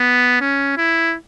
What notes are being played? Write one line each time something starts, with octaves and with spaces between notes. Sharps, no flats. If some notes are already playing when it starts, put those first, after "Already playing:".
Already playing: B3
C#4
E4